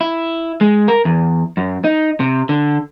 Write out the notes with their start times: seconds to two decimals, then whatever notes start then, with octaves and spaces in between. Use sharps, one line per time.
0.01 E4
0.61 G#3
0.88 A#4
1.05 E2
1.57 F#2
1.84 D#4
2.20 C3
2.49 D3